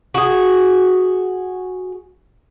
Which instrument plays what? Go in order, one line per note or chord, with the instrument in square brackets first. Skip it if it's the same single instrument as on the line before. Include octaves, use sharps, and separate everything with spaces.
[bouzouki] F#4 G#4